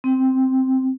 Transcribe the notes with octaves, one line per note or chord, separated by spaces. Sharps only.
C4